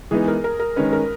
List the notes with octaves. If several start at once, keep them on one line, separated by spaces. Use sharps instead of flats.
E3 G#3 B3 D#4 G#4
A#4
A#4
A#4
D#3 G#3 C#4 B4
A#4